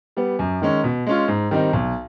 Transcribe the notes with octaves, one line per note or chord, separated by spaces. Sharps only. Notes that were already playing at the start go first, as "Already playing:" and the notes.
G3 B3
F#2
D#3 G#3 C#4
B2
G#3 C#4 F4
G#2
D#3 G3 C4 D#4
B1